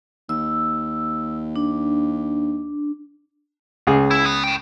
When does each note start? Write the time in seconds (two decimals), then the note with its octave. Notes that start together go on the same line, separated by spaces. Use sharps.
0.29 D#2 E6
1.56 D4
3.87 C#2 G#4
4.11 E4
4.26 B3
4.44 A2 G5